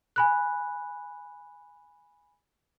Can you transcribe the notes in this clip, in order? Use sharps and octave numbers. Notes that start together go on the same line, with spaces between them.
G#5 B5 F#6